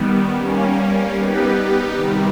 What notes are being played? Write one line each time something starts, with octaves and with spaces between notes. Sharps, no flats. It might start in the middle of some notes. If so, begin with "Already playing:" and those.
Already playing: D#3 G3 B3
G3 A#3 C#4
G3 B3 D#4 G4 B4
C3 D#3 G3